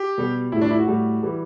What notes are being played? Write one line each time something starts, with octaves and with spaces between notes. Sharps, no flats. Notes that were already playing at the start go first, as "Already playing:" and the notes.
Already playing: G4
B2 G3
A2 G3 E4
D4
E4
F#4
A2 G3
E3 G3